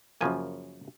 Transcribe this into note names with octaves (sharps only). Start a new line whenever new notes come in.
F#2 C#3 F3 A#3 G#5